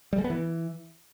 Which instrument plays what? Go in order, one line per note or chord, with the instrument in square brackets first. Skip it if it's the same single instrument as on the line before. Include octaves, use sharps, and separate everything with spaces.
[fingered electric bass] G3
G#3
B3
E3